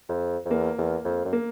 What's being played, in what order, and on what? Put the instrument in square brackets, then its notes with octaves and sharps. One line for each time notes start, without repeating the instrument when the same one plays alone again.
[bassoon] F2
F2
[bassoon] E2 [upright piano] A#3
[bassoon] E2
F2
F#2
[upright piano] A#3